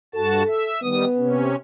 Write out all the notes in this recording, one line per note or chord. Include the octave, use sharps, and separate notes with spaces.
G2 F#4 A4 A5
E5
D#3 G3 B3 D#6
C3 C#4